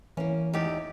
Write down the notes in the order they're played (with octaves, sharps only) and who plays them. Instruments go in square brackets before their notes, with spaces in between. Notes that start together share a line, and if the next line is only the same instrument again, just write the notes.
[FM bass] E3 [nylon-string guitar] A#3 C#4
[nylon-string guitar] E2 D#4 G4